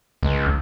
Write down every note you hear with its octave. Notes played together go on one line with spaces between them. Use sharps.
C#2